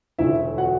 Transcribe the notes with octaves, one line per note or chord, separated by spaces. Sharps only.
E1 D2 D3 A3 E4 E5
F#4 F#5